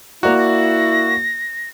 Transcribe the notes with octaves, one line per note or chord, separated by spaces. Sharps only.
A#3 E4 F#4 D5 A#5 F#6
A#6